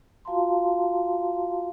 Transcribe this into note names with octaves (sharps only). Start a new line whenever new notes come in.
F4 F#4 F5 A5 A#5 C6